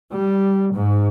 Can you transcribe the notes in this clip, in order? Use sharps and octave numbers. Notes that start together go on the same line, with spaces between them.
G3
G#2